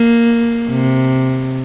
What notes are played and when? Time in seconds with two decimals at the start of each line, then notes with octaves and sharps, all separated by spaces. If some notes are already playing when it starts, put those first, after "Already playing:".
Already playing: A#3
0.71 C3